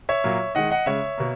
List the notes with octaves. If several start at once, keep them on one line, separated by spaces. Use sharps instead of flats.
C#5 E5
A#2 F#3 A#3
D#3 G#3 D#5 F#5
D#5 F#5
C#3 G#3 C#5 E5
B2 A#3